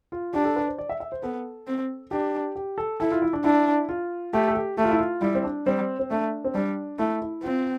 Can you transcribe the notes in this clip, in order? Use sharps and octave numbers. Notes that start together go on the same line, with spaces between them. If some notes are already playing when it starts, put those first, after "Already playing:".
F4
D4 G4
A4
B4
C5
D5
E5
E5
C5
B3 A4
C4
D4 G4
G4
A4
E4 A4
F4
E4
D4
D4 E4
F4
A3 G4
A4
G4
A3 G4
F4
E4
F4
G3 E4
C4
D4
G3 C4
C4
A3 D4
C4
G3 D4
A3 E4
E4
C4 F4